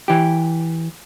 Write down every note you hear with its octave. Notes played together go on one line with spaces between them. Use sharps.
E3 G4